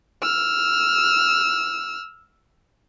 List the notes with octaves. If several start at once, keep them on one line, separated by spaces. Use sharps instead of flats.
E6 F6